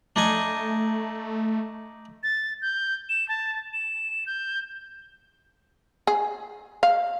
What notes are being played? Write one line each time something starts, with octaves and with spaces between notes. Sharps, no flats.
A3 D4 D#4 G#5
A6
G6
E7
A5
E7
G6
G#4
F5